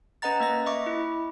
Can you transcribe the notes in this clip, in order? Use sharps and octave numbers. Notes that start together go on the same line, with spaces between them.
C#4 B4 D#5 F#5 A#5 A6
A#3 D#5 A#6
D#5 E5 C#6 D6
E4